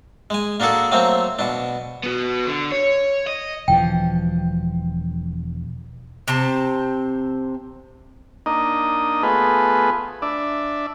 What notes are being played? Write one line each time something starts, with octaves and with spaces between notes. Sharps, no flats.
G#3 G#5
A#3 D4 F#4 G#4 A4
F#3 A3 A#3 C4
B2 D4
B3 F#4
D3
C#5
D#5
E1 E3 F3 G5
C3 C4 C5 A5
A#3 D4 D#4 D#5
A3 B3 F4 G#4 B4
D4 D5 E5